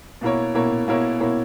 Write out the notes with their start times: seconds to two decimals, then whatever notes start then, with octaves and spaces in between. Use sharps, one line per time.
0.21 B2 A#3 E4 A#4 C#5
0.55 B2 A#3 E4 A#4 C#5
0.88 B2 A#3 E4 A#4 C#5
1.20 B2 A#3 E4 A#4 C#5